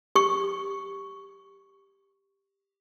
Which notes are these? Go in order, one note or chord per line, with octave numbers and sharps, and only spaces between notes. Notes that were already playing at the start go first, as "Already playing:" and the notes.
G4 C#6